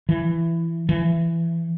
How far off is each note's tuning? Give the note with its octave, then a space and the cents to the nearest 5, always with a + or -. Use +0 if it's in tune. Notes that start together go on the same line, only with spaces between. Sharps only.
E3 +15
E3 +20